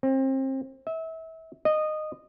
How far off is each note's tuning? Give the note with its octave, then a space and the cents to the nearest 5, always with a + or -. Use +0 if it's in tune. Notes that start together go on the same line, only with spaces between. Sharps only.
C4 +30
E5 -30
D#5 -15